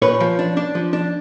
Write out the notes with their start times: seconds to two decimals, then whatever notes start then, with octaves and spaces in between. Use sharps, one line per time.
0.02 A#2 B4 C#5
0.20 F3
0.39 D4
0.57 D4
0.75 F3
0.93 D4